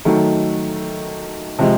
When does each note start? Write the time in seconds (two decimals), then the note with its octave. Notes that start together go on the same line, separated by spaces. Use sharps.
0.05 D#3 F#3 A3
1.59 C3 F3 G#3